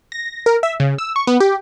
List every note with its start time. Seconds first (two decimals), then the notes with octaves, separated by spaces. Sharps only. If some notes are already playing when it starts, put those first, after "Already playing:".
0.12 A#6
0.46 A#4
0.63 E5
0.80 C#3
0.98 E6
1.16 C#6
1.27 B3
1.40 G4